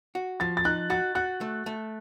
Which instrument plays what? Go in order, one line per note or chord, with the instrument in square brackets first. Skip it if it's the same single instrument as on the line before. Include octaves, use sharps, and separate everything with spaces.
[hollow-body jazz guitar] F#4
[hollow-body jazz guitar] F3 [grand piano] A6
[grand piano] A6
[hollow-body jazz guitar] D#4 [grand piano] F#6
[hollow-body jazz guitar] F#4 [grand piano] A6
[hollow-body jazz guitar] F#4 [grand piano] F#6
[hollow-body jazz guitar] A3
A3